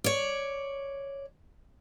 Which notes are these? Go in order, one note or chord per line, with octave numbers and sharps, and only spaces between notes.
C#5 D5